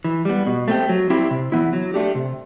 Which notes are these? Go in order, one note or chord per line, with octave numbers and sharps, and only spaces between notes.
E3
G3 B3
B2
A3 C4 G4
F#3
C4 E4 G4
C3
E3 B3 E4
F#3
A3 D4 G4
C3